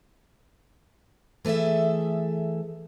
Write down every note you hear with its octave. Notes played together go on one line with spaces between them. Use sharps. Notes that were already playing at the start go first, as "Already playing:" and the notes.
E3 A3 G#4 A4 E5